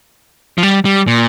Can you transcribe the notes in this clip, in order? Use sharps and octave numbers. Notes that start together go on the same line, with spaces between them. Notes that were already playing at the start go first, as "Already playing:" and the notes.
F3
G3
G3
A#2